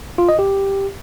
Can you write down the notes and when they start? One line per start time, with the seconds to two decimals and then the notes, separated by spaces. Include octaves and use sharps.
0.18 F4
0.29 D#5
0.39 G4